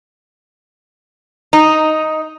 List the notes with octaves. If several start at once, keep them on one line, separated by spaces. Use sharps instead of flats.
D#4